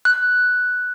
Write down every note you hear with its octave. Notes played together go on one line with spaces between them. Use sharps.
F#6